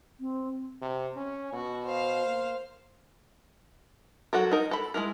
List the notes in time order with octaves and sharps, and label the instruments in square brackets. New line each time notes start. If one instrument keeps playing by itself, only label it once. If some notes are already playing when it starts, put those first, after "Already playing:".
[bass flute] C4
[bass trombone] C3
C#4
[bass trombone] B2 [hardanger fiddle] F#4
[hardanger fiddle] C5 F5
[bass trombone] A#3
[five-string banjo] F#3 F#4 A4 A#4
D#4 A#4
A4 B5
G#3 C#4 E4 A#4